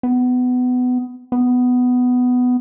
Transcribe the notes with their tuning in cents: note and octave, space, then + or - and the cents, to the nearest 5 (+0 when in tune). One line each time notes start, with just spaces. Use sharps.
B3 +20
B3 +10